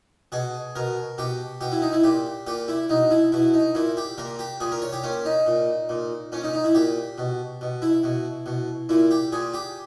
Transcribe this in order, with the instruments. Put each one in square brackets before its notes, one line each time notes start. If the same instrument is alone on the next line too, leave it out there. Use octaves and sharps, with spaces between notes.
[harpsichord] B2 G#4
B2 A#4
B2 G4
B2 G4
E4
D#4
E4
A#2 G4
A#2 G4
E4
B2 D#4
E4
B2 E4
D#4
A#2 E4
G4
A#2 A#4
G4
A#2 G#4
A#4
C#5
G4
A#2 C#4
D#4
A#2
A#2
A#2 C#4
D#4
D#4
E4
A#2 G4
B2
B2
E4
B2
B2
A#2 E4
G4
A#2 G#4
G4